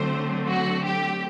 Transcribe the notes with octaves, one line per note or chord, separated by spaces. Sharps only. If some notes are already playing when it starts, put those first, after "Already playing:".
Already playing: D3 F#3 A3 C4 C5
F#4
G4